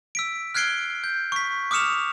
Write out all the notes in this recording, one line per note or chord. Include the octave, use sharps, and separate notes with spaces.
E6 B6 D7
F6 F#6 G#6 C7 D7 G7
G6
C#6 B6
D6 D#6 F6 C#7 E7 F7